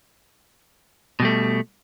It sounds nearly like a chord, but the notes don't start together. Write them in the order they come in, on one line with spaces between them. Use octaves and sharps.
B2 G3 A3